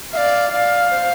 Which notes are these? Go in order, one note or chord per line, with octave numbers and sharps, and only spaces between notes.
D5 E5 F5
D5 F5
C5